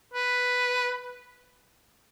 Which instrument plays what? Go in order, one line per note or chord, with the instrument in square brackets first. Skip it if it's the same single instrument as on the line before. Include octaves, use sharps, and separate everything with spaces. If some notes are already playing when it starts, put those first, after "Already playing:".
[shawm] B4